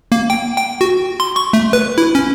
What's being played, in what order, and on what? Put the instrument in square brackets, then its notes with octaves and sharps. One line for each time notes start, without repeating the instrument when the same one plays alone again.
[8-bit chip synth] A#3
G5
G5
F#4
C6
C#6
A3
B4
E4
C#4